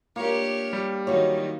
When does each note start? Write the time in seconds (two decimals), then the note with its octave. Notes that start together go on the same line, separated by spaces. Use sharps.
0.16 A#3 D4 F4 G4 C#5
0.73 G3
1.07 D#3 F#3 D#4 F4 F#4 C#5